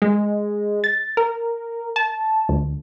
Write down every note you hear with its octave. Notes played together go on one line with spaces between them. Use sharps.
G#3
A6
A#4
A5
D2